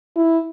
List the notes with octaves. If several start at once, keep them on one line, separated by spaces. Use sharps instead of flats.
E4